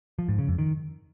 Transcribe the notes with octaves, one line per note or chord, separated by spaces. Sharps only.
F3
G#2
C#3
F2
D#3